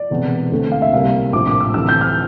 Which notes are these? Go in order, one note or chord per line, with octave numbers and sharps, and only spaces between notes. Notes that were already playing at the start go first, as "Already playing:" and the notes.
Already playing: D5
E1 E2 C3
D2 D3 A3 C4
F5
E5
C2 C3 G3 A#3 F5
A#1 A2 F3 C4 D6
D6
E6
D2 C3 E3 E6
G6
F6